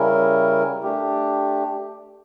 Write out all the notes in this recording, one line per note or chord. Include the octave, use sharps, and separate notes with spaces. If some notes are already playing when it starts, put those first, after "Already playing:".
Already playing: C#3 G3 C#4 E4 A#4
A3 D4 G4